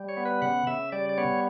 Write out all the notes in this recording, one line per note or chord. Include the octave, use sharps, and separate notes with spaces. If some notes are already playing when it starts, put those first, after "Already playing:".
Already playing: G3
C#5
B3
B4
C#3 F#5
C#3 E5
G3 D5
D5
B3 C#5